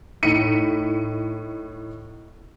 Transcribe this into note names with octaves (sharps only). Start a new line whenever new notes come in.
A2 D#4 B6 C#7 D#7